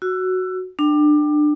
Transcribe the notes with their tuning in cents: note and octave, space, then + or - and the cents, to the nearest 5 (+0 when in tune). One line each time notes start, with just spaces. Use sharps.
F#4 +0 E6 +25
D4 +25 G5 -5